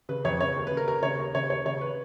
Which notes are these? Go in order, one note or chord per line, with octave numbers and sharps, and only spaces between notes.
C#3 B4
F2 C#5
C#3 C#5
D#2
B4
C#3
A#4
D#2 A#4
C#3 C#5
D#2
C#3 C#5
D#2 C#5
C#3 C#5
B4